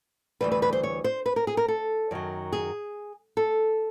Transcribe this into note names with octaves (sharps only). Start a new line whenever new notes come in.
D2 C#3 E3 G3 B4
B4
B4
C5
C#5
C5
B4
A#4
G#4
A#4
A4
F#2 D#3 F#3
G#4
A4